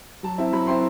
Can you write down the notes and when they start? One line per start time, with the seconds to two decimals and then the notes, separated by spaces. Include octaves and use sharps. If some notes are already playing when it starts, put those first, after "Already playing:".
0.23 F#3 A5
0.38 C4 E4
0.52 F#3 B5
0.67 C4 E4 C6